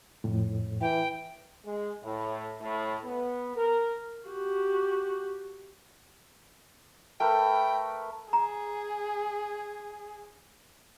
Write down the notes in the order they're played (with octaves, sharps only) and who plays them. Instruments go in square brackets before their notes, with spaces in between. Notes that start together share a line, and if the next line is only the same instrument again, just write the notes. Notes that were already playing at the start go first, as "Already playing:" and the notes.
[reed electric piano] F2 A2
[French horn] E3 [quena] G5
[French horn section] G#3
A2
A2
B3
A#4
[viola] F#4 G4
[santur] A3 A#4 B4 [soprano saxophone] G5
[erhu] G#4 [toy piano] A#5